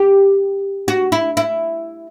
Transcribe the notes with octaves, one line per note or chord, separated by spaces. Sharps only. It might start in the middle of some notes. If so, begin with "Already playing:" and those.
Already playing: G4
F#4
E4
E4